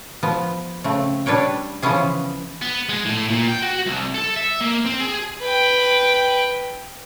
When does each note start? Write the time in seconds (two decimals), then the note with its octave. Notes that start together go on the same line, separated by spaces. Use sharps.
0.23 F3 B3
0.84 C#3 A3 C4
1.26 G3 D4 B4 C#5 G5
1.82 C#3 E3 F3 B3 C#4 G#4
2.62 B3
2.89 G#3
3.05 A2
3.29 A#2
3.48 G5
3.62 F#4
3.86 C2
4.15 A4
4.37 E5
4.61 A#3
4.85 C4
5.00 G#4
5.40 B4 G5